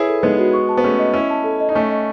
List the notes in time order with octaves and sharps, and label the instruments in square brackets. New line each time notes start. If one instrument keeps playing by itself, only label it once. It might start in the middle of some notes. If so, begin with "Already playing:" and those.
Already playing: [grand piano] E4 G#4 [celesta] B4 C#5
[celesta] A4
[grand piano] G#3 B3 [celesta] D#4
[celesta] F#4
C#6
A5
[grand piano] B3
[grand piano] A3 C#4 [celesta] G#4
[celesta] D#5
[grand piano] C#4 E4 [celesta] C#6
[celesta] A5
A4
D#5
[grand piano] D#4
[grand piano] A3 C#4 [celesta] G#5
[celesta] D#5